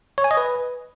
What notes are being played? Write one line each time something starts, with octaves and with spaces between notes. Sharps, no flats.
C#5
G#5
D#5
B4